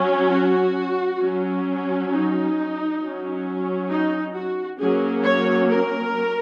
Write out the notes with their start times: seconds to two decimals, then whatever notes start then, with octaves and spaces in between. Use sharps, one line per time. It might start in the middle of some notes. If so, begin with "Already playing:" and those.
Already playing: F#3 C#4
0.30 F#4
1.21 F#3 C#4
2.11 D#4
3.00 F#3 C#4
3.90 D#4
4.35 F#4
4.80 F#3 A#3 C#4 G#4
5.24 C#5
5.69 A#4